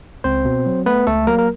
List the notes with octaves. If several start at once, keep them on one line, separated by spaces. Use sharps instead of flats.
C#2 C4 C5
B2
F#3
A3 B3 B4
C#2 A3 A4
F#3 A#3 A#4
A#4